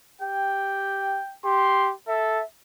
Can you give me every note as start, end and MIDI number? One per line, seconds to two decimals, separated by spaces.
0.21 1.20 67
0.21 1.35 79
1.45 1.94 67
1.45 1.91 84
2.08 2.41 69
2.08 2.44 76